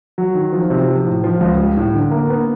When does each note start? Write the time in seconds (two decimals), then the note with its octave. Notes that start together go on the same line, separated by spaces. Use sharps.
0.18 F#3
0.35 D#3
0.53 F3
0.70 C3
0.89 F3
1.05 A2
1.24 F3
1.41 C#2
1.59 G3
1.77 A2
1.94 D3
2.11 A#3
2.30 B3